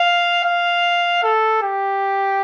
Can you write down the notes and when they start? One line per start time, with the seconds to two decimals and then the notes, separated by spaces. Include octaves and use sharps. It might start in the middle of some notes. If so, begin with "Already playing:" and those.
Already playing: F5
0.44 F5
1.23 A4
1.62 G4